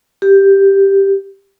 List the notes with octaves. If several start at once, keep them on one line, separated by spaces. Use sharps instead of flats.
G4